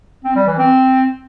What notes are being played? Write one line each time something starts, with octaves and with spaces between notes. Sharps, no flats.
C4
G3
E3
C4